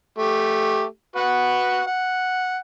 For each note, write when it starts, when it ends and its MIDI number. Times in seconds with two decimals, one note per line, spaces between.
0.19 0.84 57
0.19 0.84 67
1.16 1.83 66
1.16 1.83 71
1.16 1.83 78
1.87 2.57 78